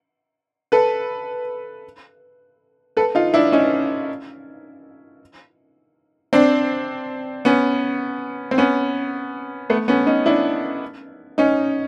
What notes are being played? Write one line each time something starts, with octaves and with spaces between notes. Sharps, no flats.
A4 B4
A4 B4
D#4 F4
D4 E4
C#4 D#4
C4 D4
B3 C#4
C4
B3 C#4
A3 B3
B3 C#4
C#4 D#4
D4 E4
C#4 D#4